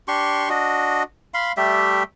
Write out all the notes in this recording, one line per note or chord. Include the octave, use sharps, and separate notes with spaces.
D4 G4 C6 C#6
D4 F#4 D#5
F5 B5 C6
G3 A3 G4 E5